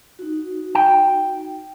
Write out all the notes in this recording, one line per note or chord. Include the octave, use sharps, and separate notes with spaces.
D#4 F#4
G5